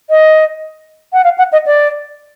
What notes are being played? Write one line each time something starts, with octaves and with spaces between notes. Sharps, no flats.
D#5
F#5
F5
F#5
D#5
D5